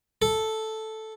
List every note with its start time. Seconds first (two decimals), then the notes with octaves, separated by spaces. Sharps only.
0.22 A4